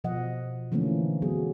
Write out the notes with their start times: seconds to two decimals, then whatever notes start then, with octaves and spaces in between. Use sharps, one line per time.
0.04 B2 F3 D#5 F#5
0.72 D3 E3 F3 A3 A#3 C#4
1.22 F#3 B3 F#4 G#4